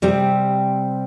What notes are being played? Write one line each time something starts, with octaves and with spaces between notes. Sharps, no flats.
C3 G3 C4